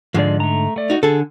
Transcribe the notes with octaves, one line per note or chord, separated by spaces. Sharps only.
G#2 D3 F3 G#3 D5
A3 A#5
A3 D5
D#4 F#4
D3 G#4 A4